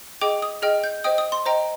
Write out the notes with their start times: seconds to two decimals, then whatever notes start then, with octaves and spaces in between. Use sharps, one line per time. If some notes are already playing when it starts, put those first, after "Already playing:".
0.21 G#4 D#5 G5 D6
0.42 D#6
0.62 G#4 D#5 G5 F6
0.84 G6
1.04 C5 D#5 G5 D#6
1.18 D#6
1.32 C6
1.46 C5 D#5 G5 A#5